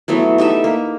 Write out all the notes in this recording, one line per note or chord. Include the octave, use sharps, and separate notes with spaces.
E3 F#3 A3 B3
D#4 G4 A4 E5
A#3